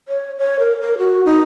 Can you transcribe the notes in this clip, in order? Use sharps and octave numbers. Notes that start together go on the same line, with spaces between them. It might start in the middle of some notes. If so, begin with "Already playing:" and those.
C#5
C#5
A#4
A#4
F#4
D#4